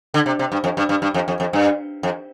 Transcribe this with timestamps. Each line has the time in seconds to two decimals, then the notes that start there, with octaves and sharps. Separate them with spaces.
0.14 D3
0.26 C3
0.39 C3
0.52 G2
0.64 F2
0.77 G2
0.89 G2
1.02 G2
1.14 F2
1.28 F2
1.40 F2
1.53 G2
2.03 F2